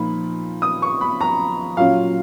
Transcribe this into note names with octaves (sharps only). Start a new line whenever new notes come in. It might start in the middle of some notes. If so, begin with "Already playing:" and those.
Already playing: A#2 F3 A#3 D#4 B5
D#6
C#6
B5
A#5
A#2 F#3 C#4 F4 F5